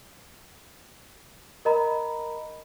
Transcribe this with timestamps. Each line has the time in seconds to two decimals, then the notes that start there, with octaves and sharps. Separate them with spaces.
1.65 A#4 D#5 A#5 B5